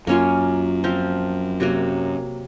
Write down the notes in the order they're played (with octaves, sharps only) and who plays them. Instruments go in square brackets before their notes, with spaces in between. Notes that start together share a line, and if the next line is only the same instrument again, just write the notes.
[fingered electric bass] F#2 [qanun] A#3 C#4 F4
[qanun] F3 C4 F4
C3 F#3 A#3